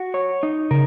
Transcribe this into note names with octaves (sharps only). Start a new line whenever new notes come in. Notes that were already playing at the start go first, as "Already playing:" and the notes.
Already playing: F#4
C#5
D#4
C#3 A#4